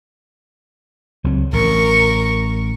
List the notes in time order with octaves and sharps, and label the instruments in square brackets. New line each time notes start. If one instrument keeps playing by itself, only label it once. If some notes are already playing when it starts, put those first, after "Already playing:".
[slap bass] C#2 F#3 C4
[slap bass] A1 [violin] A#4 C#6